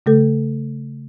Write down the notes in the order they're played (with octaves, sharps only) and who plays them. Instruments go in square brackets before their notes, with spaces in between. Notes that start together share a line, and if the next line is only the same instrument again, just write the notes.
[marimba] C#3 A3 A4